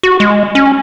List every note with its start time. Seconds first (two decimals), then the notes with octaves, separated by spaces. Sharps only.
0.03 F#4
0.20 G#3
0.55 C#4